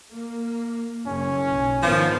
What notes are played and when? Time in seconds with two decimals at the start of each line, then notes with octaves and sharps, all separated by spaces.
0.12 A#3
1.07 F#1 C#4
1.48 B1
1.83 G#2 D#3 F3 B3